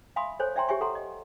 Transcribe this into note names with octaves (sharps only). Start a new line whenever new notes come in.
E5 F5 G#5 B5 C6 D#6
A4 C5 C#5 G#5
D5 E5 G5 G#5 A#5 C6
G4 C#5 E5 G#5 C#6
A4 F#5 A#5 C6
D#5